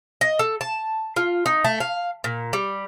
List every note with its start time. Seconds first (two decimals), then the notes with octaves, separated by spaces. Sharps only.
0.21 D#5
0.39 A4
0.61 A5
1.16 F4
1.46 D#4
1.64 A3
1.80 F5
2.24 A#2
2.53 G3